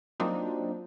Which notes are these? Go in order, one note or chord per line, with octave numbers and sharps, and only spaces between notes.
F#3 A#3 C4 D4 D#4 F4